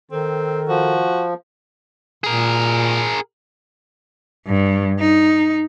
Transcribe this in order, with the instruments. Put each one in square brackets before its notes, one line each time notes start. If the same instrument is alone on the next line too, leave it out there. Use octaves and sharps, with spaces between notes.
[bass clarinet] D#3 [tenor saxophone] C4 [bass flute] A4
[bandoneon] F3 [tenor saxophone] F#4
[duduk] A#2 [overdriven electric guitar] G#4 A#4
[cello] G2
D#4